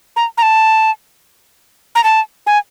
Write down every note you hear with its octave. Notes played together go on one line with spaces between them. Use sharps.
A#5
A#5
A5
A#5
A5
G#5